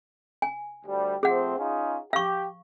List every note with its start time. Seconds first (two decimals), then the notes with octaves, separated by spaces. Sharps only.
0.42 G#5
0.85 D2 G3
1.23 F3 A3 C4 G#4 F#5
1.57 C#4 D#4 F4
2.13 G4 F5 C#6